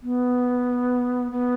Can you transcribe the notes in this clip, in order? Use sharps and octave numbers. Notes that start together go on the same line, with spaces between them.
B3
B3